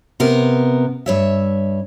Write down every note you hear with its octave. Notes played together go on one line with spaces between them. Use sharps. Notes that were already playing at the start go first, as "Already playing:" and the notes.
C3 B3 A#4
G2 C#5 E5